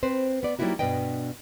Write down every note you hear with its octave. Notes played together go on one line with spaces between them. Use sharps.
C4 B4 C5
B3 D5
F#3 G3 A#3 D#4 E4 F#4
G2 B2 D4 B4 D#5 G5